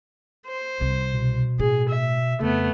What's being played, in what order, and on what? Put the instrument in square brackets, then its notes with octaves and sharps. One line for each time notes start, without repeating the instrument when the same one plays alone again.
[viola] C5
[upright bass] C2 C3
[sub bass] B2
[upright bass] A2 [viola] G#4
[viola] E5
[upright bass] F2 [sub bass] C#3 [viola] A3 B3